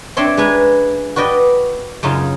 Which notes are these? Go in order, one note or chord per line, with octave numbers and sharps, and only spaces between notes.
C4 D4 C#5 E5 C6
G#3 B4 G#5 A#5
F#4 B4 D5 D#5 G5
F#2 C#3 D#4 F4